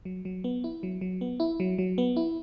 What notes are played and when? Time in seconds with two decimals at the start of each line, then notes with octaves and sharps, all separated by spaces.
0.05 F#3
0.25 F#3
0.44 B3
0.64 E4
0.83 F#3
1.01 F#3
1.21 B3
1.40 E4
1.60 F#3
1.78 F#3
1.98 B3
2.17 E4